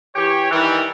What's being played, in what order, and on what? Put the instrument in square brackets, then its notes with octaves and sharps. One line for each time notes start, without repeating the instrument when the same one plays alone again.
[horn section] E3 G4 C#5
D#3 E3 G3